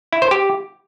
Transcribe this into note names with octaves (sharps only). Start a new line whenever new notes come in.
E4
C5
G4